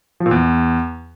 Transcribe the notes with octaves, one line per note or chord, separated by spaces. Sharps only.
F3
A#2
E2